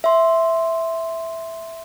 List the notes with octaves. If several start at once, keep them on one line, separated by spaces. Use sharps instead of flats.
E5 C6